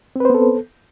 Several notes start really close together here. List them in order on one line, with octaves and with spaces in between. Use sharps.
C4 B4 C5 B3 A4